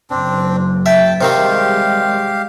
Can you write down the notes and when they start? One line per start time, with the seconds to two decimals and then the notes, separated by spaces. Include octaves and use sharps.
0.10 F#1 C4 D4
0.86 E5 G5 A5
1.21 C3 D#3 G3 G#3 C4 G4 F5